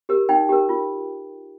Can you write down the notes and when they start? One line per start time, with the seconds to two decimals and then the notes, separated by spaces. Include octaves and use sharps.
0.09 G4 A#4
0.29 D#4 G5
0.49 G4 A#4
0.69 F4